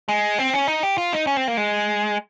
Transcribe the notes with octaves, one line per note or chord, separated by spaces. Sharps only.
G#3
C4
C#4
D#4
G4
F4
D#4
C#4
C4
A#3
G#3